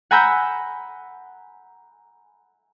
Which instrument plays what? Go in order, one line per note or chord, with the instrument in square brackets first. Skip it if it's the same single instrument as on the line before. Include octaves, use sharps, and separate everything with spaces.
[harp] F#5 G#5 A#5 B5 E6 G6